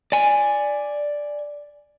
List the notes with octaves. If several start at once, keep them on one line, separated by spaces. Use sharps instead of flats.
D5 G#5